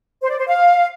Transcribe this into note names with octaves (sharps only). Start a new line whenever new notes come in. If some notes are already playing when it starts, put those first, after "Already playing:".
C5
D5
C5
F5